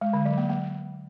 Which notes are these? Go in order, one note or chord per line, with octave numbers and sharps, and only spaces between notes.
G#3
D3
F#3
A#3
A#3